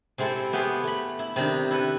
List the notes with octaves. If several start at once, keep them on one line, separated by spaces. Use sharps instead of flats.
C3 G#3 C4 E4 A4
A3 B3 G4 G#4
A3 B5
E4
C3 D#3 D4 D#4
E4 A4 B4